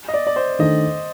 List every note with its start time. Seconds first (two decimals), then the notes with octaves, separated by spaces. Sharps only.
0.08 D#5
0.14 D5
0.27 D5
0.36 C5
0.59 D#3 A3 D4 D#5